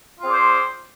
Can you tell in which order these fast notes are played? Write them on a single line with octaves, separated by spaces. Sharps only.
F4 C4 G#4 D5 C5